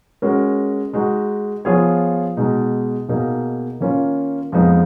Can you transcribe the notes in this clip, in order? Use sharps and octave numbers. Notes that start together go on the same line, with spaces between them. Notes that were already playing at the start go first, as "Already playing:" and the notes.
G#3 C#4 F#4 A#4
G#3 D#4 F#4
F3 B3 F4 G#4 C#5
B2 G#3 D#4
B2 A#3 D#4 G#4
D#3 A#3 C#4 F4
F2 F3 G#3 B3 D#4